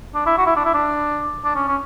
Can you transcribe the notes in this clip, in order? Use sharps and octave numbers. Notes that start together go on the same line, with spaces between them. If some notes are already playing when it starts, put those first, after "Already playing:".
D4
E4
F#4
E4
D4
E4
D4
D4
C#4
C#4